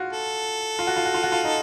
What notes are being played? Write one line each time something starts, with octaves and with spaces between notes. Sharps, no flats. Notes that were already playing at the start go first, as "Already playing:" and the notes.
Already playing: F4 F#4
A4
F4
F#4
F4
F#4
F4
F#4
F4
D#4